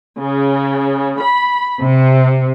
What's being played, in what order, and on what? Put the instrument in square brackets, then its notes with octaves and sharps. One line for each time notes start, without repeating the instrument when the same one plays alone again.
[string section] C#3
B5
C3